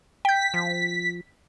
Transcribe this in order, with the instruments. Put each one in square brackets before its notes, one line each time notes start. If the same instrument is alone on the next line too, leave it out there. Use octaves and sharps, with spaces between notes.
[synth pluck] G5 G6 [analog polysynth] B6
[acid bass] F3